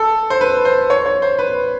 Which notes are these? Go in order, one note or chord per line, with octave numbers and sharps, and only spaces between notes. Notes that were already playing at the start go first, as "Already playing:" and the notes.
Already playing: A4
C5
B4
C5
C#5
C#5
C5
B4